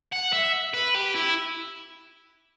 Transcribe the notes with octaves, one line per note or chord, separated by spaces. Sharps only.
F#5
E5
B4
G4
E4